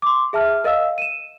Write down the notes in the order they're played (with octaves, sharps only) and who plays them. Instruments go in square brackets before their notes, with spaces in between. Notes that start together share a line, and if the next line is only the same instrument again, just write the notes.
[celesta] C6 D6
G#4 E5 A5 F6
A#4 D#5 F5 E6
D#7 E7